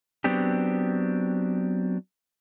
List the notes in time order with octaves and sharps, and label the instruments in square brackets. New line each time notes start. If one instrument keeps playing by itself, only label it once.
[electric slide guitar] F#3 B3 C4 D4 G4